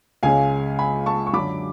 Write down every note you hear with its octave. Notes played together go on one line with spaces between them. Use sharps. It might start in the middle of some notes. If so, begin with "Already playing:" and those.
C#2 C#3 G#3 C#4 F5 G#5
G#5 B5
A5 C#6
C#6
F#2 D3 F#3 B5 D6